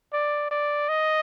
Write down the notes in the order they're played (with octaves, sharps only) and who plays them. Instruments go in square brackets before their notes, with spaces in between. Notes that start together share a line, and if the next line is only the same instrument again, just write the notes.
[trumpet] D5
D5
D#5